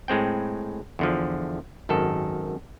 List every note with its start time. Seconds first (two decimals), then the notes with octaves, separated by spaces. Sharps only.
0.08 A2 G#3 C4 G5
0.99 E2 D3 F3
1.89 G#1 F#2 D#3 A4